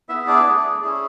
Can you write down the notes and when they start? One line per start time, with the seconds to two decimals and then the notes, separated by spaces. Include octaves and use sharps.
0.09 B3 E4 G#4 E5
0.27 D4 D5
0.46 A3 D4 G#4
0.82 C#4 E4 G#4